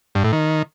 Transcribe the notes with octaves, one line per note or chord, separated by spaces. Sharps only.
G2
A2
D#3